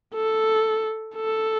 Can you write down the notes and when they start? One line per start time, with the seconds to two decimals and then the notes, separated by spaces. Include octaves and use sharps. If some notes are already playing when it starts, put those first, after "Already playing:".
0.15 A4
1.16 A4